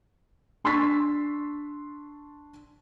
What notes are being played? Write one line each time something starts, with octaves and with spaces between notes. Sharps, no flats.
D4 C6 C#6 E6 A6 B6